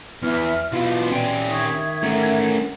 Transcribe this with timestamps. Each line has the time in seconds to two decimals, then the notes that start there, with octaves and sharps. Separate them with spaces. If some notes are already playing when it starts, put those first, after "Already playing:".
0.23 E2 E3 E5 F6
0.73 B2 E3 F4 C6
1.11 C4 C#4 G4 D5
1.49 D#3 E5 C#6 D#6 G#6
2.03 A3 C#4 A#4 F#5 A#5